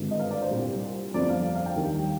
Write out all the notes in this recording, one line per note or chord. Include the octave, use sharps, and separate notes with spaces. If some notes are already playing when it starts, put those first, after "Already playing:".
Already playing: G#1 G2 D3
D#5
F5
D5
C5
C2 A#2 G3
G1 F2 D3 F3 D5
F5
F5
G5
D#2 D#3 G3